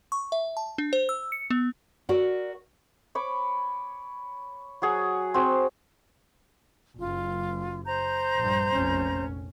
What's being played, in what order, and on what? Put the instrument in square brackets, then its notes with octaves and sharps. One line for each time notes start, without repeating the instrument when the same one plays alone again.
[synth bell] C#6
E5
A5
D4
C5
E6
C#7
B3
[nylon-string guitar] F#4 A#4 D5 E5 F#5
[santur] C#5 B5 D6
F#3 G#4 F#5
C4 F#4 G#4
[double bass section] F#1 [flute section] F4
[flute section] C5 A#5 G6
[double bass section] A#1 G2
F1 A#1 C#4